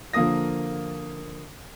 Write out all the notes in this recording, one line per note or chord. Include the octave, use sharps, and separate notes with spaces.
D3 F3 A#3 A#4 D#6 A#6